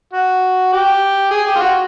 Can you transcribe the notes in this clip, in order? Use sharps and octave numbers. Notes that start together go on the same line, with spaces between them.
F#4
G4
G#4
G4
F4
F#4